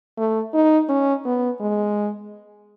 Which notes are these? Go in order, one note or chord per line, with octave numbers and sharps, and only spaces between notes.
A3
D#4
C#4
B3
G#3